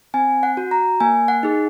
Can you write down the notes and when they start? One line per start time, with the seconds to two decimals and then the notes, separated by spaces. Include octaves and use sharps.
0.14 C4 G#5
0.43 F#5
0.57 F#4
0.71 A#5
1.00 A#3 G#5
1.28 F#5
1.43 D#4 G#4